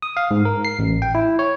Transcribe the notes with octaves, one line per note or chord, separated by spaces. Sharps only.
D#6
F5
G#2
A#4
C7
A1
G5
E4
C#5